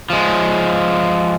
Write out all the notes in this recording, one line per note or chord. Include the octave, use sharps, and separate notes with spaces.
F3 G#3